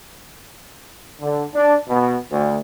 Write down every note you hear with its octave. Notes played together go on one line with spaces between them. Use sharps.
D3
D4
B2
D2